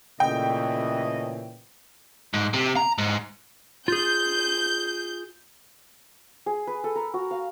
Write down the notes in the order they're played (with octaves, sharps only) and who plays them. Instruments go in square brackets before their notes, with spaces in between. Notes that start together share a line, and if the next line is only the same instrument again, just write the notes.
[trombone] A#2 [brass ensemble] C#3 E3 A3 [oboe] D#5 [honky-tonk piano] G5
[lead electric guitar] G#2
C3
A#5
G#2
[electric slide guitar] F4 G#4 [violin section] G6
[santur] G#4
B4
A4
A#4
F#4
F5